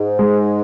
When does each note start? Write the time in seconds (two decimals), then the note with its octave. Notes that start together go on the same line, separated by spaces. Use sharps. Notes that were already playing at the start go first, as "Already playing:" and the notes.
Already playing: G#2
0.19 G#3